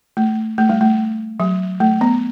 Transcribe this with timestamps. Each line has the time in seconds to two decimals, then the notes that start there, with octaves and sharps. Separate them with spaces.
0.17 A3
0.58 A3
0.69 G3
0.81 A3
1.40 F#3
1.80 A3
2.01 B3